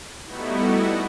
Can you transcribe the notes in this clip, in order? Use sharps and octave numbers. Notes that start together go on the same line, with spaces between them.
G3 A3 B3 D#4 E4 F#4